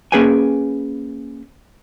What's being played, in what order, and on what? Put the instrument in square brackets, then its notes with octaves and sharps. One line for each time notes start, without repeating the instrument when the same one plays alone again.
[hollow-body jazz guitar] A#3 C#4 G#4 B4 G5 G#5